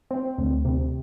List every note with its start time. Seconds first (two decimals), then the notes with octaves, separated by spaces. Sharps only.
0.11 C4
0.38 D2
0.65 C3